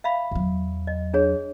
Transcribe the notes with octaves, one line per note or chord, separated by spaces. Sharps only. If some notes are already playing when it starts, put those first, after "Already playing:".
E5 F5 B5
E2 F#3
D#5
D4 G#4 C#5